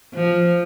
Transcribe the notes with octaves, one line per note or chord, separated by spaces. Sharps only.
F3